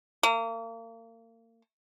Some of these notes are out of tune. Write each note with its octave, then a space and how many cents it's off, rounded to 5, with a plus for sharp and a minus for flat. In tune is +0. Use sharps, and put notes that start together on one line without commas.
A#3 -35